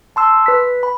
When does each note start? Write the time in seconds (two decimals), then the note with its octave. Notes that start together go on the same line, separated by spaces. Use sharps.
0.16 A5 C6 E6
0.46 B4 B6
0.83 B5